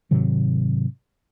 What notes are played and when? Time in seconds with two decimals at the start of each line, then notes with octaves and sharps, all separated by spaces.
0.11 G#2 C3 D#3 F#3